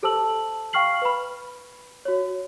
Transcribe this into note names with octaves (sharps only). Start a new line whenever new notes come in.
G4 A4 C5 A5 E6 F#7
F5 G5 C#6 F6 C7 F#7
B4 B5
F#4 C#5